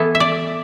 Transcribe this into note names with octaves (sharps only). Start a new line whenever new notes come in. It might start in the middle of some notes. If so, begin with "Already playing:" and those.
Already playing: E3 B3 E4 A4
E5
D5